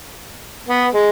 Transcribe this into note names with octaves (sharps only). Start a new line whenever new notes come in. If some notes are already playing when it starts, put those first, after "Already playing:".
B3
G#3